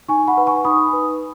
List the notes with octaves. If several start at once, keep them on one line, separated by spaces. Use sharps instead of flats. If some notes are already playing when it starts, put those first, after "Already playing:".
D#4 G#5 C#6
F#5 B5
B4
G#5 C#6
D#4 B5 D#6
B4